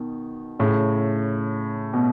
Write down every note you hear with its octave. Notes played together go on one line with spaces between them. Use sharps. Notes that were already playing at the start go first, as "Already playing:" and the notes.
Already playing: B2 D#3
A2 C#3
B2